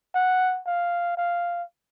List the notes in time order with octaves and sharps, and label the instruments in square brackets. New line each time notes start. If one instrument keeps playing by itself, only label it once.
[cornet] F#5
F5
F5